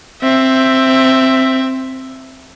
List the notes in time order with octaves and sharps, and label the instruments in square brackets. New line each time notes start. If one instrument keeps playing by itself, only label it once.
[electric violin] C4 E5